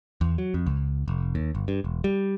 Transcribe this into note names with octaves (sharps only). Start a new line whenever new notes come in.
E2
F#3
F2
C#2
F1
D#2
G1
G2
E1
G3